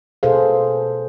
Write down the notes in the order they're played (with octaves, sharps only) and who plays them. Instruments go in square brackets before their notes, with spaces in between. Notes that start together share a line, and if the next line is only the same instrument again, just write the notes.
[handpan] B2 G#4 A4 C5 F5